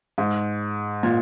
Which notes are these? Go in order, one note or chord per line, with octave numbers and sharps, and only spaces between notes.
G#2
A#2